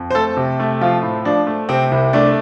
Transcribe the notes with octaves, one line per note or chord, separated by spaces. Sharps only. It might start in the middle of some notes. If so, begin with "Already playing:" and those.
Already playing: F2
C5
A3 A4
C3
A3
F3 F4
A2
F3 D4
A3
C3 C4
C2
A3 D4